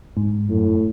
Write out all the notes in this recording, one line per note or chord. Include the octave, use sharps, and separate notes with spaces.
G#2
F#2 A2